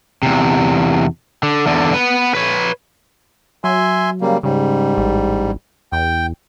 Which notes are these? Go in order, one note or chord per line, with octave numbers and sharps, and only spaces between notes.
E2 C3
D3
E2 D3
B3 B4
B4 C#5
F#3 E5 G#5 C6
C#3 G3 A#3
G#2 C#3 G3
A1
E2 G5